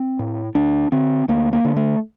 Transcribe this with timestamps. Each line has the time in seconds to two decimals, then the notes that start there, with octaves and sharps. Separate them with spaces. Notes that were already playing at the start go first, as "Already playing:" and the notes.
Already playing: C4
0.19 A2
0.55 D2 D4
0.92 D3 C4
1.28 D2 A#3
1.53 A#3
1.65 D3
1.76 A3